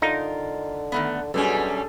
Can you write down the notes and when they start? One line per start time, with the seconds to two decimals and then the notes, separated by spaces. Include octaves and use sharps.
0.02 D3 D#4 F4 A#4
0.92 D#3 A3 B3
1.34 F#2 B2 G3 C#4 D4 G#4 A4